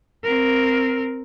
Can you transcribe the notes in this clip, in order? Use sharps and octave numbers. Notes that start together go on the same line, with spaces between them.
C4 A#4